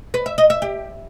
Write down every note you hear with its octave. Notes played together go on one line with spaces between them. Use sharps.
B4
E5
D#5
E5
G4